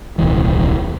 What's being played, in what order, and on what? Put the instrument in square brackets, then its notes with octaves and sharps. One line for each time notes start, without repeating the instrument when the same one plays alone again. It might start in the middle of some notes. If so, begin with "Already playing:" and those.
[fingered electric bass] D#1 C2 E3